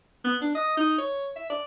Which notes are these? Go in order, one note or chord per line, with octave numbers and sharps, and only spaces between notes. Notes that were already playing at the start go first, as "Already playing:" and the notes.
B3
D4
D#5
D#4
C#5
E5
D5